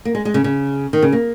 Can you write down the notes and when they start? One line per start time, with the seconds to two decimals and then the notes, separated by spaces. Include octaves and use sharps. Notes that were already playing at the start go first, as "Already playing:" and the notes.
0.05 A#3
0.15 G#3
0.25 G#3
0.34 C#3
0.44 C#3
0.93 D#3
1.02 C#3
1.12 A#3